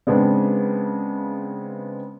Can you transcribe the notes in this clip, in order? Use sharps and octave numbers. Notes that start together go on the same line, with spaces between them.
C#3 G#3 B3 C4 D4